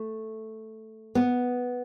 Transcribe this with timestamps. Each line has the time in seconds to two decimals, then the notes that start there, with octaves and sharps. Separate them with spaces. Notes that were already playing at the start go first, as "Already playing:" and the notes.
Already playing: A3
1.15 B3